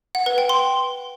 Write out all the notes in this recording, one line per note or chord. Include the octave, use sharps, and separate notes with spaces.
F#5
B4
G5
C6